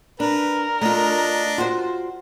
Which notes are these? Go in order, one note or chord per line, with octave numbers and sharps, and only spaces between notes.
D4 A#4 B4
A3 D4 F4 D#5
F4 F#4 C5